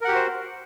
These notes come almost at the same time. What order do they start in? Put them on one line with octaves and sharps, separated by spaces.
A#4 F#5 G4 F#4 C5